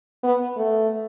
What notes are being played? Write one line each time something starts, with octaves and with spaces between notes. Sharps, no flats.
B3
A3